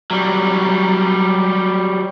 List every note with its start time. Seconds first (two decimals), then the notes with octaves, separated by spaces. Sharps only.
0.11 F#3 G3